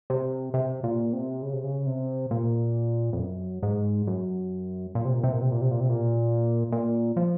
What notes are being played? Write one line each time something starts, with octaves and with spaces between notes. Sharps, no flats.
C3
C3
A#2
C3
C#3
C3
C#3
C3
A#2
F2
F#2
G#2
F#2
A#2
C3
A#2
C3
A#2
C3
A#2
C3
A#2
C3
A#2
A#2
F3